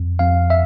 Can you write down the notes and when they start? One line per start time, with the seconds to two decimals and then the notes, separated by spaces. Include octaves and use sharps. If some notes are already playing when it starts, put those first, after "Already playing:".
Already playing: F2
0.19 F2 F5
0.50 E5